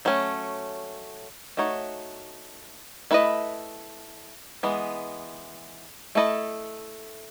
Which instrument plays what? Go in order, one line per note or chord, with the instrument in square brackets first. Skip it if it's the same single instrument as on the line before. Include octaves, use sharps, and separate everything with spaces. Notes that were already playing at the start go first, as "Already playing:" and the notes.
[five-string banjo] F#3 A3 C#4
A3 D#4 F#4 C#5
A3 E4 B4 D#5
E3 G#3 B3
A3 E4 A4 D#5